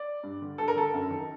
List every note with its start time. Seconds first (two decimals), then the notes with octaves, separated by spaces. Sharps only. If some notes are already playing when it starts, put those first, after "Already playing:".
Already playing: D5
0.23 G2
0.42 D3
0.58 G2 A4
0.68 A#4
0.76 D3 A4
0.94 F#2
1.10 D#3